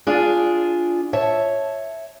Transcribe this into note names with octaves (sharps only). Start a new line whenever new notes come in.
D4 F4 G#4
C#5 E5 A5